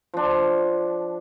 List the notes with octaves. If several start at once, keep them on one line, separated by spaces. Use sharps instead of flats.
F3 D4